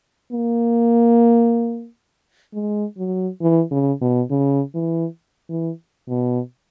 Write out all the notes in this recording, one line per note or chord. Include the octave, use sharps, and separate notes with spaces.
A#3
G#3
F#3
E3
C#3
B2
C#3
E3
E3
B2